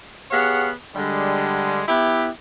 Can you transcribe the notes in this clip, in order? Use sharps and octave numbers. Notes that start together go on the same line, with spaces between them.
B3 G4 G#4 C#5 F5 F#5
D3 G3 G#3
B3 E4 G4